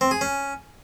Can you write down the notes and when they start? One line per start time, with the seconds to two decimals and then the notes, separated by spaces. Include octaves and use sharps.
0.01 C4
0.11 G#4
0.21 C#4